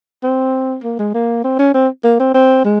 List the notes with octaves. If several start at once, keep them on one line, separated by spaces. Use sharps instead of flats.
C4
A#3
G#3
A#3
C4
C#4
C4
A#3
C4
C4
G#3